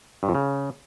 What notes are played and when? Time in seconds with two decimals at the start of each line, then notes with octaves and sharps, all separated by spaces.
0.23 G2
0.29 F2
0.35 C#3